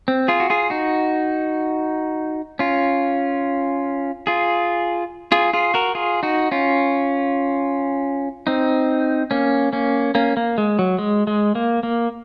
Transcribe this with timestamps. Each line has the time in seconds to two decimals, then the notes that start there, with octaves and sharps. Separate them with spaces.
0.08 C4
0.28 F4 G#4
0.40 F#4
0.50 F4 G#4
0.70 D#4 F#4
2.59 C#4 F4
4.27 F4 G#4
5.32 F4 G#4
5.53 F4 G#4
5.74 F#4 A#4
5.95 F4 G#4
6.23 D#4 F#4
6.51 C#4 F4
8.47 C4 D#4
9.31 A#3 C#4
9.73 A#3 C#4
10.15 A#3 C#4
10.37 A#3
10.58 G#3
10.79 F#3
10.99 G#3
11.27 G#3
11.55 A#3
11.83 A#3